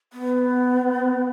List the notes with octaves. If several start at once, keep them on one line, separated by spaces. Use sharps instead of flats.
B3